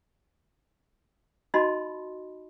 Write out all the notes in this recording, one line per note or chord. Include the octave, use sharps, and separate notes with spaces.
D#4 F#4 D#5 A5 B5 C6